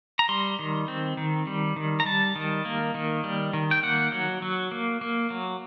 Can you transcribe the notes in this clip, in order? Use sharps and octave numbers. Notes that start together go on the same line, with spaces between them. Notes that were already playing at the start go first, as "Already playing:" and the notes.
A#5
G3 C6
D#3
C4
D#3
G3
D#3
A#5
G3 A5
D#3
A#3
D#3
G3
D#3
G5
A#3 F#5
F#3
F#3
A#3
A#3
F#3